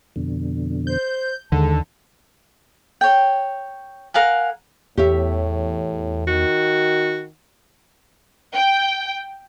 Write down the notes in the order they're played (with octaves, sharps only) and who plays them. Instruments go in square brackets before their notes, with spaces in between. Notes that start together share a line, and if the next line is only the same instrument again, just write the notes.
[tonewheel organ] F2 B2 D3
[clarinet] C5 [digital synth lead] G6
[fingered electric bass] D#2 [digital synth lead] D3 [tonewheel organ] G#3 A4 [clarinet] A5
[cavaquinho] C#5 G5
A#4 F5 F#5 G#5
[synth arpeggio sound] E2 [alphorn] A2 [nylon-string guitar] G4 C#5 E5
[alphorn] D#3 [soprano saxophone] F#4
[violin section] G5